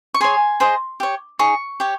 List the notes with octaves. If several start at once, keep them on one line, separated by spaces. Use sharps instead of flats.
C#6
G#4 C#5 G#5 C6
G#4 C5 D#5
G4 C#5
D#4 G#4 C#6
G4 C#5